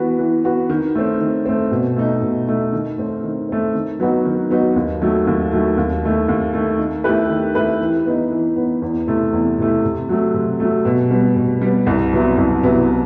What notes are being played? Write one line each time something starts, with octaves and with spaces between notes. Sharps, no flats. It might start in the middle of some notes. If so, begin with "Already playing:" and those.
Already playing: E3 B3 F#4
E3
B3 F#4
D#3
A3 C4
D#3
A3 C4
B2
A3 D#4
B2
A3 D#4
D#3
A3 C4
D#3
A3 C4
D#3
F#3 B3 D#4 F#4
D#3
F#3 B3 D#4 F#4
D#2
D#3 F#3 A3
D#2
D#3 F#3 A3
D#2
D#3 A3
D#2
D#3 A3
D#3
A3 E4 G4 B4
D#3
A3 E4 G4 B4
E3
B3 D#4
E3
B3 D#4
E2
C3 E3 A3
E2
C3 E3 A3
C3
F#3 A3
C3
F#3 A3
B2
G3 B3
B2
G3 B3
C2
C3 F#3 B3 E4
C2
C3 F#3 B3 E4